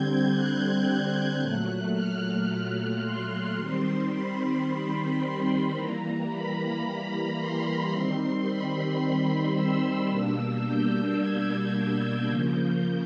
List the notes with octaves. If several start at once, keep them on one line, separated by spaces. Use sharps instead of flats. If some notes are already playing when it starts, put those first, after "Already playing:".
Already playing: D3 G3 C4 G6 G#6
F#6
A#2 F#3 A3
F6
C6
D#3 G3 C4
B5
E3 G3 A#3 A#5
B5
C6
D#3 G3 C4
B5
B5
E6
B2 G3 A#3 D4 E6
G6
G#6
C#3 F3 A#3 G6